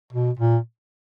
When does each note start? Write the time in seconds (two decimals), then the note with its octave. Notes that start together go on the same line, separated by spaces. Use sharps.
0.13 B2
0.39 A#2